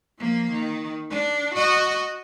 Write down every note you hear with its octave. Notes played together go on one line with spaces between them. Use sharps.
F3 A#3
D#3
D4
F#4 D#5